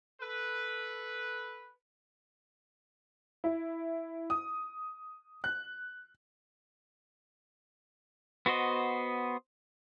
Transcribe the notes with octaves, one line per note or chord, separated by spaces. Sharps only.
A4 B4
E4
D#6
F#6
B3 F#4 C5 D#5